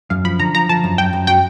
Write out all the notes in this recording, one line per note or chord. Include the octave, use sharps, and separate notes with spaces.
F#2 F5
F3 B5
D3 A#5
F3 A#5
F3 A5
F#2
F#2 G5
F#2
F#3 G5